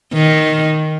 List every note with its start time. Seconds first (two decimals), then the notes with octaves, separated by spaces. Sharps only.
0.13 D#3